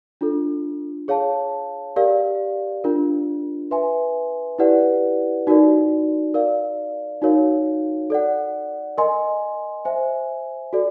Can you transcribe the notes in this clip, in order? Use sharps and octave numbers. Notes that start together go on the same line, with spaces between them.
D4 F4 A4
G#4 C#5 F5 A5
G4 A#4 D5 F5
D4 F4 A#4
B4 E5 G#5 C6
E4 G4 B4 D5 F#5
D#4 F#4 A#4 D5
A#4 D5 F5
D#4 F#4 A#4 C#5 F5
A4 D5 F#5
A#4 D#5 G#5 C6
C5 E5 G#5
F#4 A4 D5